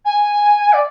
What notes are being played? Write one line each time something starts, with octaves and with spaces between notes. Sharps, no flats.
G#5
D5